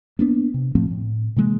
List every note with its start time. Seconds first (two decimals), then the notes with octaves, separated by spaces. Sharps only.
0.19 A#3 B3 D4
0.54 C3
0.75 A2 F3 A3 C4
0.91 A2
1.36 C3 E3 G#3 A#3